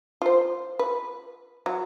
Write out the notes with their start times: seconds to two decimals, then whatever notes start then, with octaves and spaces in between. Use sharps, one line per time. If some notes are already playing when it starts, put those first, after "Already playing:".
0.22 F4 C5
0.79 B4
1.66 F#3